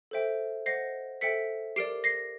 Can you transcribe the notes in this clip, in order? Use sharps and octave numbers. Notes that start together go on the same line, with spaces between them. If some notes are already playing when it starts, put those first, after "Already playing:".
A4 C5 E5 G5
C5 D#5 F#5 A#6 C7
A4 C5 E5 G5 B6 C#7
G4 A#4 D5 C7 D7
A#6 C7